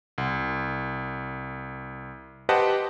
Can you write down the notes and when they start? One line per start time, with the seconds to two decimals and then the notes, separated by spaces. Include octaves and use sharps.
0.18 C2
2.49 G4 B4 C5 D#5 F#5 A5